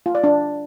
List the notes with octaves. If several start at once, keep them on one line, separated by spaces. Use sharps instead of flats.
F4
D5
D4